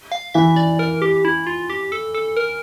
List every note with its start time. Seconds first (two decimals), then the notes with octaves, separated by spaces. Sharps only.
0.12 F5
0.34 E3 E5
0.56 D5
0.79 A#4
1.02 G4
1.25 E4
1.47 F4
1.70 G4
1.92 A4
2.14 A4
2.37 A#4